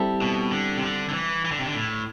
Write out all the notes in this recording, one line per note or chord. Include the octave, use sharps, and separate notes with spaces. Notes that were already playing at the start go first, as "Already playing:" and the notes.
Already playing: G3 C4 E4 A4
B2
D3
C3
D3
D3
E3
E3
D3
C3
D3
A2